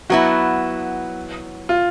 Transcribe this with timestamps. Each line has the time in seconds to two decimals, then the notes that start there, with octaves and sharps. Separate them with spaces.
0.10 F#3 B3 E4 F#4
1.69 F4